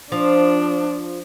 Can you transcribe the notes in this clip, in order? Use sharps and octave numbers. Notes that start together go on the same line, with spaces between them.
F3 D4